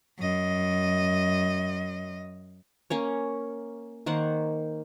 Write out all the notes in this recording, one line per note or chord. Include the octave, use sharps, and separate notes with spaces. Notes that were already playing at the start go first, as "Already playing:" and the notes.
F#2 D#5
A#3 C#4 C#5
D#3 A#3 C5 F#5